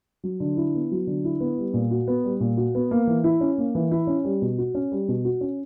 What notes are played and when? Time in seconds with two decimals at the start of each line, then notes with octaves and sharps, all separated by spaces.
0.23 F#3
0.40 D3
0.57 E4
0.75 B3
0.91 F#3
1.07 D3
1.24 E4
1.40 B3
1.58 G3
1.74 A#2
1.91 F#4
2.08 B3
2.24 G3
2.40 A#2
2.57 F#4
2.75 B3
2.91 A#3
3.07 E3
3.24 E4
3.41 C#4
3.58 A#3
3.75 E3
3.91 E4
4.07 C#4
4.24 G3
4.42 B2
4.58 F#4
4.75 C#4
4.92 G3
5.08 B2
5.25 F#4
5.41 C#4